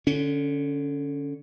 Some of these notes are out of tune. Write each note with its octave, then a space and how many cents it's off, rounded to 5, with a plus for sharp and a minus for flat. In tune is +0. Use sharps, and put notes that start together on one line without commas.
D3 +0 C#4 +25